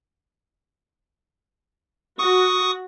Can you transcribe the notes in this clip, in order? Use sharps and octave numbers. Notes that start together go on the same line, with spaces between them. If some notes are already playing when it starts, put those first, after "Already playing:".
F#4 C#6 D#6